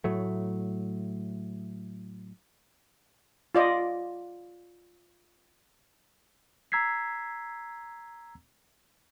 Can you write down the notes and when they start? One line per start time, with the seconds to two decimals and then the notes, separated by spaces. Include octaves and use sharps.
0.04 A2 F#3 A3
3.55 F4 D5 D#5
6.72 A#5 E6 G#6 B6 C7